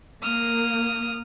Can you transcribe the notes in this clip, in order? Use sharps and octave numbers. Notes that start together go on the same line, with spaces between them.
A#3 D#6 F6